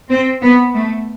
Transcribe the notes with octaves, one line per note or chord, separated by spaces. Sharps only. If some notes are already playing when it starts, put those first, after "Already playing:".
C4
B3
A3